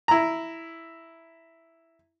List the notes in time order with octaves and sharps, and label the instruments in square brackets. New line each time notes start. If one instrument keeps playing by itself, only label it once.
[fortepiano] E4 A#5